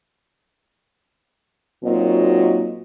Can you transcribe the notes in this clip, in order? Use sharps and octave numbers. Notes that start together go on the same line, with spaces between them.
A#2 F#3 C4 D#4 F#4 D#5